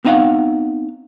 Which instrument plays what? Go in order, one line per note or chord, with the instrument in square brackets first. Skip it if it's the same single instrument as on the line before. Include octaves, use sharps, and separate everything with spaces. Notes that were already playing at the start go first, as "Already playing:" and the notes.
[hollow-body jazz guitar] B3 C4 D#4 D#5 F5 F#5